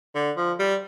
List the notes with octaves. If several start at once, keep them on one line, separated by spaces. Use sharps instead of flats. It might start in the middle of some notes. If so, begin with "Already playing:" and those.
D3
F3
G3